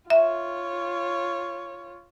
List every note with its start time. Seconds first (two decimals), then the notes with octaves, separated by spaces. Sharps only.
0.10 F4 C#5 E5